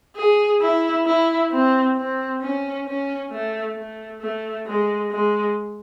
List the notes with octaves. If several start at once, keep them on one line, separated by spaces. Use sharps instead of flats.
G#4
E4
E4
C4
C4
C#4
C#4
A3
A3
A3
G#3
G#3